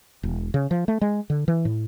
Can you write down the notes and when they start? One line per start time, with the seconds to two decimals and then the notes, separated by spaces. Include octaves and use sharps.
0.23 E1
0.54 C#3
0.71 F3
0.88 A3
1.01 G#3
1.30 D3
1.48 E3
1.65 A2